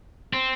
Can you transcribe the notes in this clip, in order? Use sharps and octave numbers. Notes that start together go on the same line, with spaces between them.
C4